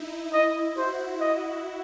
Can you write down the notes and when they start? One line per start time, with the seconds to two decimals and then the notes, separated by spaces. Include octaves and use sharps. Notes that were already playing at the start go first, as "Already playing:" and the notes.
Already playing: D#4 E4
0.33 D#5
0.77 F#4 C5
1.21 D#5